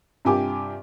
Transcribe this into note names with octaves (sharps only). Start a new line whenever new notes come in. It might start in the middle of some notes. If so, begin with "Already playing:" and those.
G2 C3 F4 G4 G#5 D6